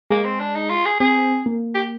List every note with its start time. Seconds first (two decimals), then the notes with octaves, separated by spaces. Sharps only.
0.10 G#3 A#3
0.25 C4
0.40 D4
0.56 D#4
0.70 F4
0.85 G#4
1.00 C4 G#4
1.46 A#3
1.75 G4